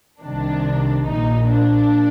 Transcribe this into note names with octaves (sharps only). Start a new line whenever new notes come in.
C2 C3 D#3 D4
A#1 A#2 D#4
D4